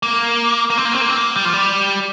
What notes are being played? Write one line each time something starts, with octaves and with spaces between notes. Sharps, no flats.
A#3
A#3
C4
A#3
C4
A#3
C4
A#3
G3
F3
G3